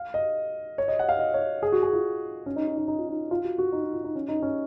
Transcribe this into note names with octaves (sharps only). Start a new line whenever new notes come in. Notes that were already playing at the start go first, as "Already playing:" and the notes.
Already playing: F5
D#5
C#5
D#5
F#5
F5
D#5
C#5
G#4
F#4
G#4
F4
C#4
D#4
D#4
D#4
D#4
F4
D#4
F4
F#4
F#4
D#4
D#4
F4
D#4
C#4
D#4
C#4